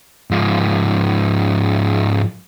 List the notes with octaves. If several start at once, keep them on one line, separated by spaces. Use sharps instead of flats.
G#2 F3